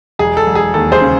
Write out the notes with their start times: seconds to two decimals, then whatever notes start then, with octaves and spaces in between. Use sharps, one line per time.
0.19 E1 G#4
0.37 A4
0.46 E1
0.55 G#4
0.74 D#2 A4
0.92 G#4 C5
1.01 C#3